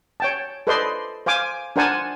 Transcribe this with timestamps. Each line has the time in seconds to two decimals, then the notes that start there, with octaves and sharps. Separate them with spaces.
0.20 C#5 G5 A5
0.67 A4 B4 C5 D5 D#5 C6
1.26 C5 F5 G#5 D6
1.76 D4 A#4 C5 F#5 G#5 A5